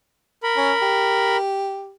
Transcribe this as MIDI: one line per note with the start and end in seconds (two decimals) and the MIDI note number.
0.43 1.37 70
0.43 1.37 83
0.57 0.72 61
0.82 1.94 67